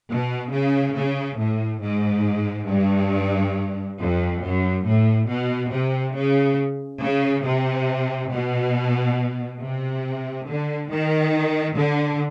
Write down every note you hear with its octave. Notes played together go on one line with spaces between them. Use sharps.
B2
C#3
C#3
A2
G#2
G2
F2
F#2
A2
B2
C3
C#3
C#3
C3
B2
C3
D3
D#3
D3